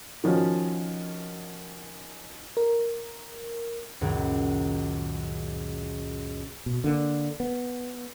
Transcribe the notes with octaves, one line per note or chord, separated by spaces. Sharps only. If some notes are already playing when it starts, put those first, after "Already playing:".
D#3 F3 C#4 F#4
A#4
C#2 F#2 A#2 D#3
B2
D3 A#3
B3